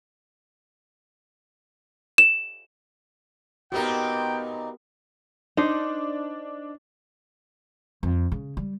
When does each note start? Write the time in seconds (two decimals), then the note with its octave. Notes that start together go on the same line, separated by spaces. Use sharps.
2.18 E7
3.72 A#2 B3 C4 D#4 F#4 G4 A#4 G5
5.57 D4 D#4 C5
8.03 F2
8.32 C#3
8.57 G3